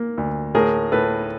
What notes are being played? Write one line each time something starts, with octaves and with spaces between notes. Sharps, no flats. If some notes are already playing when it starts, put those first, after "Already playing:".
Already playing: A#3
D2
A2 G#4 A#4
A2 A4 B4